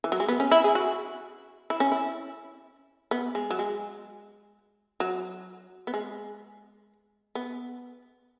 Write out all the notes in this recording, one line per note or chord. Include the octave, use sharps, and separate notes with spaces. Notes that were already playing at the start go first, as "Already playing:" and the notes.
E3
F#3
G#3
B3
C#4
E4
G#4
F#4
E4
C#4
E4
B3
G#3
F#3
G#3
F#3
B3
G#3
B3